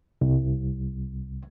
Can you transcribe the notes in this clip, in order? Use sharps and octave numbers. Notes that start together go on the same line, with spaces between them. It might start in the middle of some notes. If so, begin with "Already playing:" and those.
C2